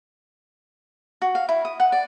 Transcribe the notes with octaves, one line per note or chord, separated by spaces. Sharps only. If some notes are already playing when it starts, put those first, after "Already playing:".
F#4
F5
E4
D#6
F#5
D5